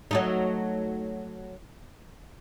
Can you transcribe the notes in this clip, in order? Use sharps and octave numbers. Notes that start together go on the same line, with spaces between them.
F#3 A3 D#4